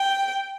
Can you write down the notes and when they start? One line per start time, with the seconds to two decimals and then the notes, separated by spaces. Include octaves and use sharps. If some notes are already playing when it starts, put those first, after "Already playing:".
Already playing: G5